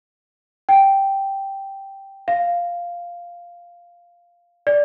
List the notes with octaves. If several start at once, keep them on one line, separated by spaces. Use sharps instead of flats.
G5
F5
D5